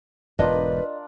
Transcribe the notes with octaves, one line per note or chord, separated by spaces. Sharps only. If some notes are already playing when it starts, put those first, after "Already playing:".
E1 G#2 D4 F4 A#4 B4 D#5